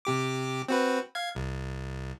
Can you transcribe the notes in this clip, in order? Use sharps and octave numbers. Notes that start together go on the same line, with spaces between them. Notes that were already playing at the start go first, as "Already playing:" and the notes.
C3 G4 D6
C4 F#4 B4
F5 G#6
C2